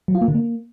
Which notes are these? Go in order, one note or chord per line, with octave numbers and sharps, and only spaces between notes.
F#3
F4
A#3
D3
A#3